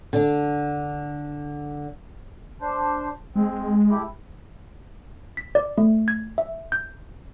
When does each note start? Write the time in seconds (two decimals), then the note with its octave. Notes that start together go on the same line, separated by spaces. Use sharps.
0.13 D3 D4
2.61 D4 C5
3.36 G#3 C4
3.91 A3 E4 G4
5.37 B6
5.55 D5
5.78 A3
6.08 G#6
6.38 E5
6.72 G6